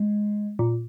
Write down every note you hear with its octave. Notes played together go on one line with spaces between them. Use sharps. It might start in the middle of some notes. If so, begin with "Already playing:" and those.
Already playing: G#3
A#2